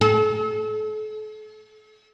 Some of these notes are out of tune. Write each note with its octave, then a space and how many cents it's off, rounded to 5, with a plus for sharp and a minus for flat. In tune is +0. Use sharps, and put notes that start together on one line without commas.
A4 -40